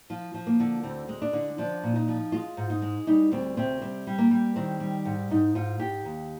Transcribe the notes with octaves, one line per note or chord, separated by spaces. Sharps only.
F3 F4
F3
A#3
D3
D2 C4
G#3
D4
D3
F3 D4
A#2
D#4
F3
G#3 F4
G#2
D#4
G#3
G3 D#4
D2 C4
C3 C4
G3 C4
G3
A#3
G3
D#3 C4
G3
G#2
G#2 D#4
G#2 F4
G#2 G4
D#2